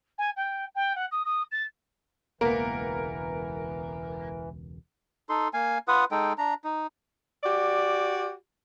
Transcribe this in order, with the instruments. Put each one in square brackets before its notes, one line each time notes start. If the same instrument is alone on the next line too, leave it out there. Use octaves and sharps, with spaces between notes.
[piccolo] G#5
G5
G5
F#5
D#6
D#6
A6
[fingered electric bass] E1 C#2 [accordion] E3 [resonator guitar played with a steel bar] A#3 B3 [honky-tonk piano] A#4
[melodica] D#4 A4 C6
A#3 F5 G#5
F4 B4 F#5 D#6
G#3 D#4 A4 G5
D4 A#5
D#4
[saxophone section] F#4 G4 D5